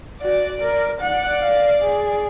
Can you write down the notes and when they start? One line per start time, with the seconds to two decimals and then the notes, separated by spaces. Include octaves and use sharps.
0.22 F#4 D5
0.62 A#4
1.01 D5 F#5
1.42 F5
1.82 G#4